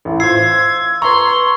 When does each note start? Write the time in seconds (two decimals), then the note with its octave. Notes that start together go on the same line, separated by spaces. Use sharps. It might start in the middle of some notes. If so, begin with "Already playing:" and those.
0.05 A1
0.20 F4 C5 E6 G#6 C7
1.02 B4 A#5 C6 C#6